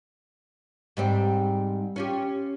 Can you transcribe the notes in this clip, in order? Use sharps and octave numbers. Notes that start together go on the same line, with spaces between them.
G#2 G3 C4
C#4 F4 G4